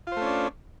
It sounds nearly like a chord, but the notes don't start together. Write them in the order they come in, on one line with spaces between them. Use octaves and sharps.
F4 C5 A3 C#4 D4